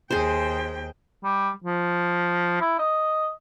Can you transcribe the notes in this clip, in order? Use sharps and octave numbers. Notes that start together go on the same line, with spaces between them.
D#2 G#4 C5 G5
G3
F3
E4
D#5